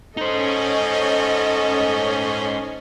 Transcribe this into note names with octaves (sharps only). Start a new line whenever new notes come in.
C#4 D#4 A4 C5 D#5